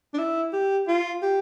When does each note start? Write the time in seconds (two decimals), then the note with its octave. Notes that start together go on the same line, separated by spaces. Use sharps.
0.14 D4
0.18 E4
0.53 G4
0.88 F4
1.22 G4